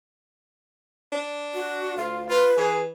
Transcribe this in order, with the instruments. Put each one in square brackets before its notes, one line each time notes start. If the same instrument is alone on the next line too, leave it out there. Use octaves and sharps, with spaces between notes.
[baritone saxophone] D4
[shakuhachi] F#4
[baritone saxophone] D2 [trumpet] F4 [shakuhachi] F5
[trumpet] F4 [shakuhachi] B4
[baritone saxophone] E3 [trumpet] G#4